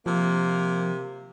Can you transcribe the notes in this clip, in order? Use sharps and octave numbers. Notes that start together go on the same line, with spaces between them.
C3 F3 A#3